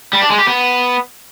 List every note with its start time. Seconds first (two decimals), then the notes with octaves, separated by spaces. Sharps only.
0.13 G3
0.22 D4
0.30 G#3
0.39 G4
0.47 B3